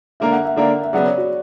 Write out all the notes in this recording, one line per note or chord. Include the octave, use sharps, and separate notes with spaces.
D3 A#3 D4 A#4 E5
F#5
E5
D3 A#3 D4 A#4
E5
C#3 F#3 B3 D5
C#5
F#4